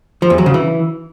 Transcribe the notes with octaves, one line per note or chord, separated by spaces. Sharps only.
F3
E2
F#3
C#3
E3